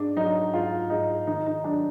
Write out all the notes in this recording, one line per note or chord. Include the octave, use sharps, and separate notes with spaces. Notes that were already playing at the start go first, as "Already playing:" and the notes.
Already playing: G#2 D4
F#3 D#4
G#2 F4
G#2 D#4
D#3 D#4
D#4
F#3 D4